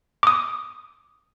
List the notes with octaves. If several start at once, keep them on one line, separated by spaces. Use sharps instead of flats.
D6 D#6